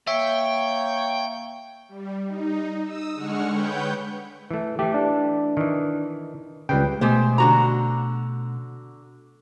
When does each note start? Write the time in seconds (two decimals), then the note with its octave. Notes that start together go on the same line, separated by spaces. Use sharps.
0.07 A#3 C#5 E5 G5
1.89 G3
2.27 D#4
2.84 D#6 E6
3.14 D3 G#3 F#5 C#6 F6
3.49 B4 C#5 F#5 G5 G6
4.51 E3 A3
4.79 E3 A3 G4
4.94 D4
5.57 D#3 E3
6.69 C#2 C#3 G3 B4 G5
7.01 B2 G#3 A3 G4 C5
7.38 D3 F#4 A#5